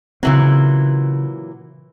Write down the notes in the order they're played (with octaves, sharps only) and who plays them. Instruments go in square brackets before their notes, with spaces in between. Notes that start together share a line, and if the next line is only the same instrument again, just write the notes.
[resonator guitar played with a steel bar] A#2 E3 F#3 [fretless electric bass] C#3 C4